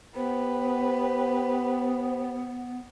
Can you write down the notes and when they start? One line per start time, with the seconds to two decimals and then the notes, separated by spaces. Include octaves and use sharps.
0.15 B3 G4 B4 C5